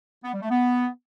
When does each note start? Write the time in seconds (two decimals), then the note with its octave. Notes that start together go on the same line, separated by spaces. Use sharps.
0.24 B3
0.33 G3
0.41 A3
0.50 B3